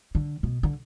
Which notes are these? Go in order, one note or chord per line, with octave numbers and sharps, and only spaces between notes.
D3
B2
D3